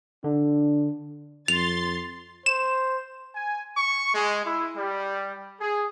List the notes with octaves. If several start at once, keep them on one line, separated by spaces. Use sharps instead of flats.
D3 D4
F2 C6 A6 F7
C5 E7
G#5
C#6
G#3
E4
G3
G#4